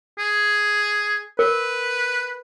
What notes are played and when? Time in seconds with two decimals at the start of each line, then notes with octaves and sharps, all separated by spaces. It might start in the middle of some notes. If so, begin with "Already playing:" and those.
0.19 G#4
1.39 A#4 B4